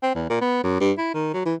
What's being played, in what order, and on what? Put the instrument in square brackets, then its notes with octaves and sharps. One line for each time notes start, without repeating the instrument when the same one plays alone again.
[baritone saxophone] C4
E2
A#2
B3
F#2
G2
E4
D#3
F#3
E3